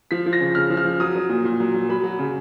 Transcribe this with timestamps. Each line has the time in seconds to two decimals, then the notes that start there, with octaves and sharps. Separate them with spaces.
0.11 F3 B6
0.26 F3
0.33 A#6
0.40 C#3
0.55 C#3 F6
0.70 F3
0.77 F6
0.85 F3
1.00 F#3 D#6
1.15 F#3
1.29 A#2
1.45 A#2
1.60 F#3
1.74 F#3
1.89 F#3 B5
2.04 F#3
2.19 C#3